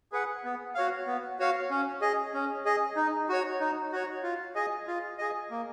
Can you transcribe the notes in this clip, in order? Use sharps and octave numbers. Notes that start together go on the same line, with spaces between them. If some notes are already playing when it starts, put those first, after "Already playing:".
G#4 B4 F#5
B3
F#4 C#5 F5
B3
F#4 C#5 F5
C#4
G#4 D#5
C#4
G#4 D#5
D#4
F#4 C#5
D#4
F#4 C#5
F4
G#4 D#5
F4
G#4 D#5
A#3